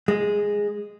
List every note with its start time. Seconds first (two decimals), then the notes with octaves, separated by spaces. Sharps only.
0.08 G#3